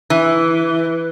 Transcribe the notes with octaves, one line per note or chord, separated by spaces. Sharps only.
E3